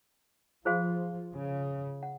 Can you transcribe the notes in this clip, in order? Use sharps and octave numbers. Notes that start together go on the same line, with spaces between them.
F3 F4 G#4 C5 F5 C6
C#3
F#5